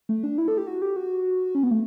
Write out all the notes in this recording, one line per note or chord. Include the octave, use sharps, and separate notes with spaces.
A3
D4
E4
A4
G4
F#4
G4
F#4
C#4
B3
A3